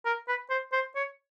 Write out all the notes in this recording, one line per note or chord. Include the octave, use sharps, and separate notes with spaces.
A#4
B4
C5
C5
C#5